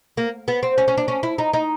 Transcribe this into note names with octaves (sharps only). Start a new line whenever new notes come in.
A#3
B3
C4
C#4
C#4
D4
C#4
E4
D#4
D#4